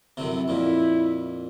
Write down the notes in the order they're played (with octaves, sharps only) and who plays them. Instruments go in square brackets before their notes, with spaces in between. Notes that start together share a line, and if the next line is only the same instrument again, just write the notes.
[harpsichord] F#2 A2 C3
[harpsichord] F2 A#2 [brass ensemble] E4